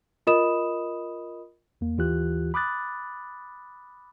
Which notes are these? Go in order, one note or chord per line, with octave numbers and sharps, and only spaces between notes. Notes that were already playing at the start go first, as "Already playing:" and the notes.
F4 A#4 D#5 B5 D#6 E7
E2 A#3
D#2 E3 F4 G4 F#6
B5 D6 D#6 F#6 A6